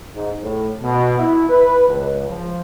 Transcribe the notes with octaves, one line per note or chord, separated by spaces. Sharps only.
G#2
A2
B2
E4
B4
C#2
F3